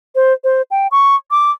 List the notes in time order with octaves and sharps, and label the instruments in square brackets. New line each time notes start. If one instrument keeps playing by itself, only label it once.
[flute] C5
C5
G5
C#6
D6